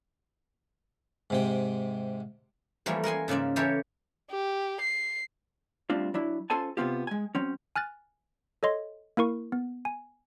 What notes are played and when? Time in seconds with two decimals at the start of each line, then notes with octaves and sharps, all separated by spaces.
1.30 G#2 C3 G5
2.86 E3 F3 G3 A3 A#3
3.04 A#4 F#5 G#5 C6
3.28 G#2 C#3 A#3 D5 E5
3.56 E3 E4 G4 A4 A#4 C#5
4.30 G4
4.81 C7
5.90 G3 A3 C4 D4 F4
6.14 F#3 D4 E4
6.50 C#4 F4 A4 C5 G#5 A5
6.77 C3 B3 C4 F4 G4
7.07 G#3 G#5
7.35 F#3 C4 C#4
7.76 G#5 F6 F#6 A6
8.63 A4 C#5 D#5 C6
9.17 A#3 E4 A#4 C#6
9.52 B3
9.85 G#5